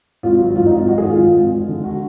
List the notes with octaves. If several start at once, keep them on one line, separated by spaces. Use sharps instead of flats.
G#1 F4
F#3
G#2 F4
D#4
G#1 F4
G#3 F#4
G#4
D#3
F4
G#2
G#1
G#3
D3
F#4